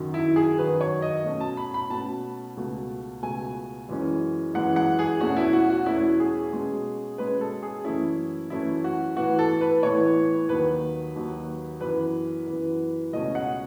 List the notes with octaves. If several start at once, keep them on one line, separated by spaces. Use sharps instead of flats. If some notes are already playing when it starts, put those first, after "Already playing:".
Already playing: F#2 D#3 F#3
E4
G#4
F#2 D#3 F#3 B4
C#5
D#5
B2 A3 C#4
A5
B5
B5
B2 A3 C#4 A5
C#2 B2 A3
C#2 B2 A3 G#5
F#2 E3 G#3 C#4
F#2 E3 G#3 C#4 F#5
F#5
G#4
E2 B2 A3 C#4 F#4
E4
F#4
F#4
E2 B2 A3 C#4 E4
G#4
B2 G#3 C#4
B2 G#3 C#4 B4
A4
G#4
F#2 E3 A3 C#4 E4
F#2 E3 A3 C#4 E4
F#4
A2 E3 B3 F#4
A4
B4
A2 E3 B3 C#5
D#2 D#3 F#3 B4
D#2 D#3 F#3
F#2 E3 B3 B4
F#2 E3 B3
C#2 B2 A3 C#4 D#5
F#5